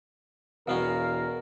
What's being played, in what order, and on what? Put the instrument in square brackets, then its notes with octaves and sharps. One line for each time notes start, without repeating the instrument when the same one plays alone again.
[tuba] E1 [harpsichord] B2 B3 C#4 [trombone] A#4 [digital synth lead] F5